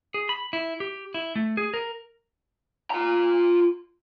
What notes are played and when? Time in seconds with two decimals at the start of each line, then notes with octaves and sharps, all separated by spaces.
0.14 G#4
0.29 B5
0.53 E4
0.80 G4
1.14 E4
1.36 A3
1.57 G#4
1.74 A#4
2.91 F4 A#5